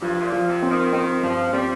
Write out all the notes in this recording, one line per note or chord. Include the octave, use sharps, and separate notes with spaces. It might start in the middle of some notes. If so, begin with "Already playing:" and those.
G2 F3
C3
A#2
F3
C3
C4
D#3
D#3 C4
G2 F3
G3 C4